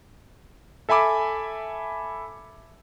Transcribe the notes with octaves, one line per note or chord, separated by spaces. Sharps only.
A4 E5 G#5 B5 D6